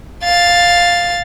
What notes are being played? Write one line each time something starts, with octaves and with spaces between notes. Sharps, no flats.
F5 A6